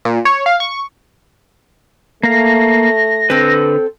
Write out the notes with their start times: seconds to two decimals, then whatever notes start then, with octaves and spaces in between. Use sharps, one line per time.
0.05 A#2
0.25 C#5
0.46 F5
0.60 C#6
2.23 A3 A#3 F5 A#6
3.30 D3 C4 A4 B4